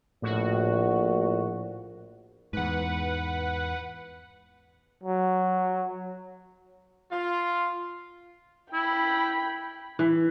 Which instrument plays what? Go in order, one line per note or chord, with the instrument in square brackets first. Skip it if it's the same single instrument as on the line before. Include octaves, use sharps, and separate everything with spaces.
[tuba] A#1 [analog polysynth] A2 F#4
[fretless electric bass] E2 G#2 [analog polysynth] B4 F#5
[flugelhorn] F#3
[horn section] F4
[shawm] E4 [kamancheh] G5 B5
[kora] E3